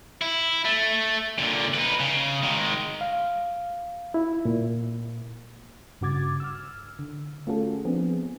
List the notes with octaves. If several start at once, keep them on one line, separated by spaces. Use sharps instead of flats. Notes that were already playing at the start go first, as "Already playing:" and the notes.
E4
A3
A#2 D3
D#4 B4
C#3
D#3 G#3
F5
E4
A#2
G2 C#3 F#4 D6 G#6 A6
E6 F6
D3
A3 C#4 F4 F#4 G#4 A4
F3 B3 C4 D4 G#4